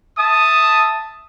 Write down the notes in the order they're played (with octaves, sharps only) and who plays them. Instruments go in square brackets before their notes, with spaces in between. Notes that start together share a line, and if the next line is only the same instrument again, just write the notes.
[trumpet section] E5 A5 D#6